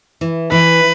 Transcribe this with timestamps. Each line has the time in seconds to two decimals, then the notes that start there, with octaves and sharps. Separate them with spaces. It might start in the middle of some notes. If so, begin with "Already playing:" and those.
0.21 E3
0.52 E3 B4